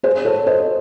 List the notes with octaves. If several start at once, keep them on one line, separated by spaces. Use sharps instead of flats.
G#4 C5
A4 C#5
C5 D#5